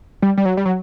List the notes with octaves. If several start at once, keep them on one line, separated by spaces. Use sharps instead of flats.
G3
G3
F#3
G3
F#3